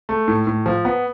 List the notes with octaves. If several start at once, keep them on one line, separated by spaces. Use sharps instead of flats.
A3
A2
A2
F3
B3